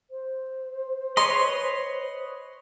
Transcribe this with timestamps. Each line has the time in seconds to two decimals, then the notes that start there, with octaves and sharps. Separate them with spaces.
0.10 C5
1.17 B4 C#5 D#5 C6